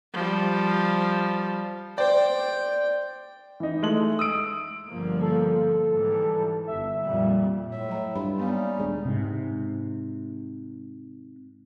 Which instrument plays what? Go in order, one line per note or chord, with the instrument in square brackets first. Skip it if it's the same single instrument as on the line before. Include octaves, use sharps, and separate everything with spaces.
[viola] F3 G3
[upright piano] C5 D5 [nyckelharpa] G5
[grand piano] E3 D#4
G#3 A3 F#7
D#6 E6 D7
[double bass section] G1 F3 A#3
[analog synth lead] A4
[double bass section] G#2 E3 G3
[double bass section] G1 [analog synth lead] E5
[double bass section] F2 A#2 G3
[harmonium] A2 E5 [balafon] C#5
[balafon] F#3 A#5
[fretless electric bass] G2 [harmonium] F4 [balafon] B5
[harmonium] G3 C#4 D#4 [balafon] A#3 B3 F5
[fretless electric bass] D#1 G#3 D4
G#2 C3